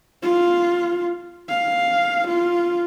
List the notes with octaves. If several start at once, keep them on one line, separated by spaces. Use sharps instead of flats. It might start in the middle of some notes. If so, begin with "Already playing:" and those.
F4
F5
F4